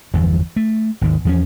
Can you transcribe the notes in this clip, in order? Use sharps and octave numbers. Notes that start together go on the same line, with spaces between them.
G1 E2 E3 F3
A3
G#1 D#2 G#2
E2 F3 C#4